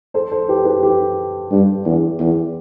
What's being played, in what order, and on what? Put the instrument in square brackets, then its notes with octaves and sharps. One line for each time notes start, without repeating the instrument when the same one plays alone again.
[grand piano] A4 C5
A4 C5
G4 B4
G4 B4
G4
[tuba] G2
E2
E2